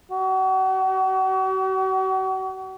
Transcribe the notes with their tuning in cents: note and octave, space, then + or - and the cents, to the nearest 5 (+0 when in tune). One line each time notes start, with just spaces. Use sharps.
F#4 +40